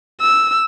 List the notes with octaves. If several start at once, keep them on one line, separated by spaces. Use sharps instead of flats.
E6